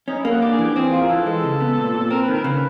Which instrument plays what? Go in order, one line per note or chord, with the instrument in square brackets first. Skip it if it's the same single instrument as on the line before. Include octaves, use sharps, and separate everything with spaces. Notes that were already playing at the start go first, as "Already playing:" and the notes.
[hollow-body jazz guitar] C#4 [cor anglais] D#4
[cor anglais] E4
[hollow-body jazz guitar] A#3
[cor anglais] F#4
[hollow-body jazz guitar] D4 [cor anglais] G4
[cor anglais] G#4
[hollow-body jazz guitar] E3 [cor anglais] G4
[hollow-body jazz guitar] C4 [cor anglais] G#4
[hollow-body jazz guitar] F4
[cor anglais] A#4
[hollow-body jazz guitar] E3 [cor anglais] A4
[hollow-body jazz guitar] G#3
C#3
B3
A#2
A#2
[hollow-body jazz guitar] C4 [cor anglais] A#4
[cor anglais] B4
[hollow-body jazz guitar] D#3
[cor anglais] A#4
[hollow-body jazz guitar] C#3 [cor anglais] B4